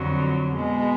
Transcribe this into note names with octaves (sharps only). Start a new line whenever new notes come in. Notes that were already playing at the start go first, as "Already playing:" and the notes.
Already playing: F2 D3 F#3
B2 G#3